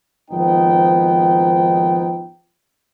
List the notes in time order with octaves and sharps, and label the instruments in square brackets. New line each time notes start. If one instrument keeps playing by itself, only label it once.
[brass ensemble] G#1 F3 B3 D#4 G5